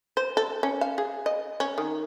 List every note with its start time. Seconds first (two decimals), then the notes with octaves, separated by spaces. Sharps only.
0.17 C5
0.37 A4
0.63 C#4
0.81 F5
0.98 G#4
1.26 D#5
1.60 C#4
1.78 D#3